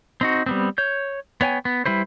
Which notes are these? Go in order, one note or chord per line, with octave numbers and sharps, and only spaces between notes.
C4 D#4 F#4
G3 B3 C4
C#5 G6
B3 C#5 G5 G#5
B3
G3 E4 B4 C5